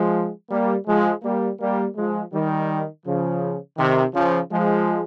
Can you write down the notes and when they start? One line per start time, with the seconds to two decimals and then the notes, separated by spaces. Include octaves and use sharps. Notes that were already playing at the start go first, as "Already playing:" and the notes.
Already playing: F3 G#3
0.50 G3 A#3
0.87 F3 G#3
1.23 G3 A#3
1.60 G3 A#3
1.96 F3 G#3
2.32 D#3 G3
3.06 C#3 F3
3.78 C3 D#3
4.14 C#3 F3
4.51 F3 G#3